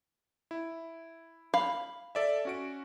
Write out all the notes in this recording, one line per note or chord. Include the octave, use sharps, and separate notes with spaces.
E4
F5 B5
A4 D5 E5
C#4 F#4 D7